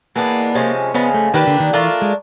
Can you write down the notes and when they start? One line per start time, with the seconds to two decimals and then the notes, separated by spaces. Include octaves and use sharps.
0.16 E3 G#3 A#3 B3 D4
0.55 C3 F3 G#3 C#4
0.94 C#3 F3 G#3 B3
1.14 A3
1.34 D#3 A#3 D4 G4 B4
1.47 D3
1.60 D#3
1.73 E3 A3 D4 F4 A#4
2.02 G#3